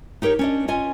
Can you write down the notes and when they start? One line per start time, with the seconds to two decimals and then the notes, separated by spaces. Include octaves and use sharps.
0.22 D#4 G4 A#4 B4 C#5
0.39 C#4 D4 D#5
0.68 C#4 F4 D#5 G#5